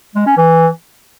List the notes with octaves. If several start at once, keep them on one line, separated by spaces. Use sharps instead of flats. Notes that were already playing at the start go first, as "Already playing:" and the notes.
G#3
C#4
E3